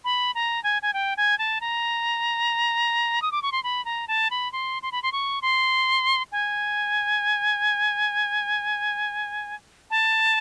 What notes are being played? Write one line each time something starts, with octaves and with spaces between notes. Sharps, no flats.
B5
A#5
G#5
G#5
G5
G#5
A5
A#5
D#6
D6
C#6
C6
B5
A#5
A5
B5
C6
C6
B5
C6
C#6
C6
G#5
A5